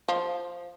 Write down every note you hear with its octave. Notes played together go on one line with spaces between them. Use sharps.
F3